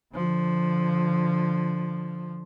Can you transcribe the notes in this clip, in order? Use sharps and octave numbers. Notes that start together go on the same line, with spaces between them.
D3 F3